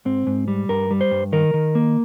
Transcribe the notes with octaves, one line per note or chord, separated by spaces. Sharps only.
G#2 C4
G#2
G3
G2 A#4
G3
C5
G2
D#3 A#4
D#3
A#3